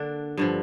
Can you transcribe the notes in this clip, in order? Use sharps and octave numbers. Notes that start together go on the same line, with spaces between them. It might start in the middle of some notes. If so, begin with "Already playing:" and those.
Already playing: D3 A#3 D4
G2 D3 F3